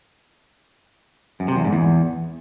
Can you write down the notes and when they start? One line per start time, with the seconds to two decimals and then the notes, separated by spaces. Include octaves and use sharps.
1.40 F#2
1.48 C3
1.56 E2
1.65 G#2
1.73 E2